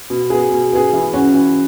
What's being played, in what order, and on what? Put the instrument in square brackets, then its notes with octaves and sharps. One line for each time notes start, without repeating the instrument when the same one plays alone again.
[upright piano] B2
B3 G#4
B2
B3 G#4
E3
C#4 F#4
E3